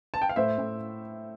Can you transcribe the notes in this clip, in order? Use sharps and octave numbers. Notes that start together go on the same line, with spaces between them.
A5
G5
F5
A2 C5 E5
A2